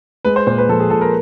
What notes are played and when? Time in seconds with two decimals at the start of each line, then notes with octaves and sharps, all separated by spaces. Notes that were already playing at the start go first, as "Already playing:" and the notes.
0.25 G#3 B4
0.36 C5
0.47 A#2 C5
0.58 B4
0.69 F3 A4
0.80 G#4
0.90 A#2 A4
1.01 A#4